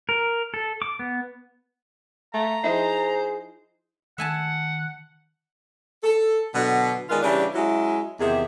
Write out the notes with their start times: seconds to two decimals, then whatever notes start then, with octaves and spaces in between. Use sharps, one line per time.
0.09 A#4
0.54 A4
0.82 D6
0.99 B3
2.34 A3 F5 A#5
2.64 F3 D#4 E4 G#4 C5
4.18 D#3 E5 F#5 G#5 A5
6.03 A4
6.54 B2 D3 F#3
7.09 D#3 G#3 B3 F4 B4 D5
7.22 C#3 E3 G3 D4 G4 C#5
7.53 F#3 G#3 C#4 E4
8.19 E2 C3 D#3 G4 G#4 E5